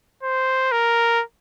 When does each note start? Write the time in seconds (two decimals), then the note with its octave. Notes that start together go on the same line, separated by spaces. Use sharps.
0.23 C5
0.72 A#4